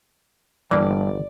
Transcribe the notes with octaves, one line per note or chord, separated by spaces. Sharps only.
G1 G2 E3 A#3 D5